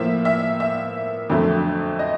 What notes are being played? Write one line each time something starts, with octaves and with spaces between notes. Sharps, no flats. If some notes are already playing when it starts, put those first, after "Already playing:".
Already playing: A2 F3 A#3 E5
E5
E5
F2 D3 F#3 A3
D#5